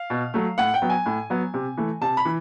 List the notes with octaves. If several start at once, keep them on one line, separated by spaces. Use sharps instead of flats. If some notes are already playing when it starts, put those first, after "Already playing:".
Already playing: F5
B2
F#3 A3
A2 F#5
G5
F#3 B3
G#5
A2
F#3 B3
C3
E3 A3
C3 A5
B5
E3